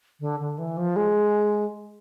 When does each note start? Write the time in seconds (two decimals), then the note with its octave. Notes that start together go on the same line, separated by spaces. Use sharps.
0.20 D3
0.40 D3
0.58 E3
0.77 F3
0.96 G#3